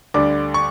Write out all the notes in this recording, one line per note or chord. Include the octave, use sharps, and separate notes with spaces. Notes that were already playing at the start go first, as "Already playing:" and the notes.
D2 D3 G3 D4 D6
C#6